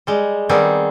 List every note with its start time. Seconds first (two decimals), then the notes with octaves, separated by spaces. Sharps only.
0.07 G3 G#3
0.49 D#3 G3 B3 C4 G#4